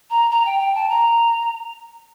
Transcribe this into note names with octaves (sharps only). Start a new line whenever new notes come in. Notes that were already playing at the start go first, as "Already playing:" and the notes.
A#5
A#5
G5
G5
A5
A#5